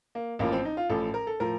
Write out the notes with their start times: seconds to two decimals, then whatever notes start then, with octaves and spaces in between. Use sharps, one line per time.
0.15 A#3
0.39 A1 A2 F3 A#3
0.52 C4
0.65 D#4
0.77 F4
0.90 A1 A2 F3 A4
1.14 A#4
1.27 A4
1.40 A2 F3 A#4